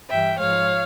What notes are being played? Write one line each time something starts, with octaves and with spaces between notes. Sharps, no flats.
G2 E3 G3 E5 G5
G#2 F3 G#3 C#5 F5